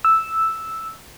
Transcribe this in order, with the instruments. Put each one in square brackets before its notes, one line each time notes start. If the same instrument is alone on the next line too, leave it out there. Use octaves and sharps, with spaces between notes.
[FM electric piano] E6